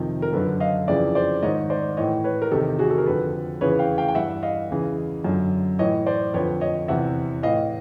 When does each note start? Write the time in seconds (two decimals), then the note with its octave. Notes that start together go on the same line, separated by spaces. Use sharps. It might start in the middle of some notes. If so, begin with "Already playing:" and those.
Already playing: F2 C3 D#3
0.22 A#4
0.33 F#2 D3 A4 B4
0.60 D#5 F5
0.88 F2 C#3 E3 D5 E5
1.15 C5 D5
1.43 G#2 D#3 C#5 D#5
1.70 C5 D5
1.97 A2 E3 C#5 D#5
2.24 B4 C#5
2.42 A#4
2.51 E2 C3 D#3 G4 A4
2.79 F#4 G#4
2.90 A4
2.98 A#4
3.06 F2 D3 A4 B4
3.61 E2 C#3 E3 B4 C#5
3.79 F5 G5
3.98 F5 G5
4.08 G5
4.15 G2 E3 E5 F#5
4.43 D#5 F5
4.70 E2 C#3 E3
5.24 F#2 D3
5.79 A2 E3 C#5 D#5
6.06 C5 D5
6.34 F2 D3 B4 C#5
6.61 C#5 D#5
6.88 E2 C3 E3 E5 F#5
7.43 A2 E3 D#5 F5